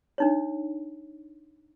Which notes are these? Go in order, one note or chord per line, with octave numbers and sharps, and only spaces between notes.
D4 D#4 C#5